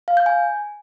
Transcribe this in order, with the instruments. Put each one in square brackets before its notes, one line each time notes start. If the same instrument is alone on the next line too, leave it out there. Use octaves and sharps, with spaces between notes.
[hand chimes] F5
G6
G#5